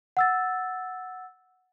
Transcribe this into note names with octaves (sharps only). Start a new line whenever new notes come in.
F#5 E6 A6